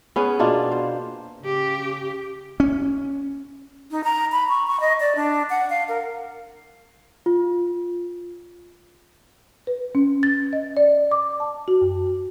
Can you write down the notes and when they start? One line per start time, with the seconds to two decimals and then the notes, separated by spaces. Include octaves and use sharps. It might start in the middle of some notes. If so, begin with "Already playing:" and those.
0.16 B3 C#4 G#4
0.39 B2 A#3 D4 F4
0.71 C5
1.41 C#3 G4
2.60 C#4
3.91 D#4
4.04 A#5
4.32 B5
4.49 C#6
4.67 C#6
4.81 D#5
5.00 D5
5.16 D4
5.50 F#5
5.70 F5
5.89 A#4
7.26 F4
9.67 B4
9.95 C#4
10.23 A6
10.53 D#5
10.77 D5
11.11 D6
11.40 A5
11.68 F#4
11.81 F#2